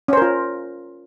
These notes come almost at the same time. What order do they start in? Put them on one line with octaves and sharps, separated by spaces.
C#4 C5 A#4 F4